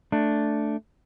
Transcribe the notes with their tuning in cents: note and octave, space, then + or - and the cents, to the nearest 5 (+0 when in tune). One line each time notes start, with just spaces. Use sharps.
A3 +0 D4 +0